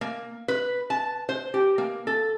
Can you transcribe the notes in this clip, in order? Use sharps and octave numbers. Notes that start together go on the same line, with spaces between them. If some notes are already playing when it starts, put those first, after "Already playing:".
A#3
B4
A5
C5
G4
A#3
A4